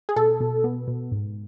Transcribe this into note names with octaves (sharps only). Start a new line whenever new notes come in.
G#4
B2 A4
B2
B3
B2
G#2